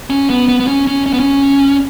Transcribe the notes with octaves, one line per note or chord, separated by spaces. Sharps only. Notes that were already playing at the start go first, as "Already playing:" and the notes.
C#4
B3
B3
B3
C#4
C#4
C#4
B3
C#4